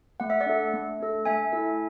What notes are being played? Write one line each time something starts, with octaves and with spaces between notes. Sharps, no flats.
A3 F#5
E5
D5 F#5
D4 A4
A3
D4 A4
A3 E5 G#5
E4 A4